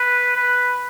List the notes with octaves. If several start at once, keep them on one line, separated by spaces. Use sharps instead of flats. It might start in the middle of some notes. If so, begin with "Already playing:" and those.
Already playing: B4
B4